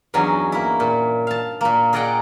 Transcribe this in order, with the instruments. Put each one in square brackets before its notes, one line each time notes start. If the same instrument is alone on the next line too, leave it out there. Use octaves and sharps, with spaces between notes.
[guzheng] E2 G2 F#3 C#4 D#4 G#5
A#3 E4
A#2
F5 A5
A#2 A#3
G#4 A#4 D5 D#5 F#5 G5